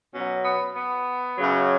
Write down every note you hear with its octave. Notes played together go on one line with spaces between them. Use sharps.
B2 F#3 C#4
B3
B3
F#2 C#3 F#3